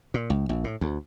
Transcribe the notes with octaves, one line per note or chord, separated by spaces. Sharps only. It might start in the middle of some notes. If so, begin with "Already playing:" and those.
A#2
C#2
A#1
A2
D2